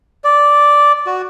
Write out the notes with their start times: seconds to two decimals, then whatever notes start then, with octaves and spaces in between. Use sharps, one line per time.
0.24 D5
1.07 F#4